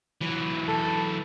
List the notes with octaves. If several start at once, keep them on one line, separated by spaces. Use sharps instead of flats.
E3 F#3
A4